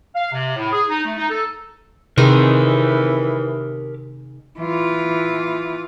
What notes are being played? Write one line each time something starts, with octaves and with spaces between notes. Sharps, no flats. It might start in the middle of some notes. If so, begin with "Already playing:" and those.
F5
C3
A2
G#4
D#4
A3
D#4
A4
C3 D#3 E3 G#3 D#4 G4 A#4
E3 F4